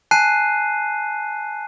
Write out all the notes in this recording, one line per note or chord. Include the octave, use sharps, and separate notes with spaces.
G#5 A5 F#6 C7 D#7